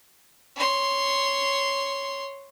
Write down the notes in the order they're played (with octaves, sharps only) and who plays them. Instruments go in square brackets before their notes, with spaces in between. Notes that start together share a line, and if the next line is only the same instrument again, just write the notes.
[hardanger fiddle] C#5 C6